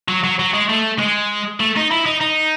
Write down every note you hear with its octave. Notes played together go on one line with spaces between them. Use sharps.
F#3
F#3
F#3
G#3
A3
G#3
A3
D#4
E4
D#4
D#4